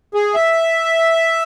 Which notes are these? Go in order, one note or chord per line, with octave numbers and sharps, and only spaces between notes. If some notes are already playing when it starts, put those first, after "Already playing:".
G#4
E5